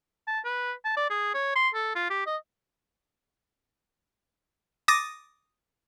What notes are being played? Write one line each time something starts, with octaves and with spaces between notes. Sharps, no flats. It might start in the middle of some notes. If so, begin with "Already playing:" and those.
A5
B4
A5
D5
G#4
C#5
C6
A4
F4
G4
D#5
D6 D#6 A6 A#6 D#7